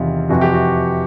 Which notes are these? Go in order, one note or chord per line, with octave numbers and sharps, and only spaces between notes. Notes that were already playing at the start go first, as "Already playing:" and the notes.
Already playing: E2 C3 D#3 F4
F2 C3 E3 F#4
G4
F#4